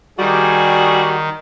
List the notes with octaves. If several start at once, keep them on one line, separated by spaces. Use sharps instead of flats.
D#3 G3 F#4 G#4